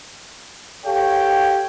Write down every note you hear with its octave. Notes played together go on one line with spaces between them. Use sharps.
G4 A4 C#5 F5 G5